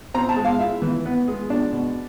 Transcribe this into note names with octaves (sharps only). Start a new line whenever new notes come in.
C4 A#5
A5
G#3
F5
E4 E5
E3
B3
G#3
D4
B2